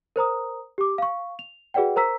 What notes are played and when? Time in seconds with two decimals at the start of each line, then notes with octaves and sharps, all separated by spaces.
0.16 A#4 C5 A#5 D#6
0.78 G4 D6
0.98 F5 C#6
1.39 F7
1.74 F#4 G#4 B4 D5 F#5 G5
1.96 A#4 C5 A#5 E6 B6